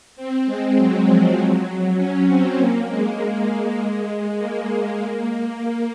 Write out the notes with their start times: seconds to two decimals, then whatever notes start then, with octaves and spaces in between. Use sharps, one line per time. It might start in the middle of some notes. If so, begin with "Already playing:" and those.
0.16 C4
0.46 G#3
0.76 F#3
1.07 F3
1.37 F#3
1.97 C#4
2.28 C4
2.57 A#3
2.88 G#3
4.38 A#3
4.98 A#3
5.59 A#3